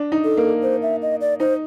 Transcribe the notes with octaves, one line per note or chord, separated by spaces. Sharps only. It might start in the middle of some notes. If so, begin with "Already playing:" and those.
Already playing: D4
D#4
A4
A#3
C5
E5
D#5
D5
D#4 C5